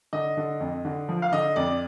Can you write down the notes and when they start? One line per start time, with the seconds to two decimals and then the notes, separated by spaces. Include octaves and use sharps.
0.13 D3 D#5
0.37 D3
0.60 F2
0.85 D3
1.09 F3
1.22 F5
1.32 D3 D#5
1.56 F2 D5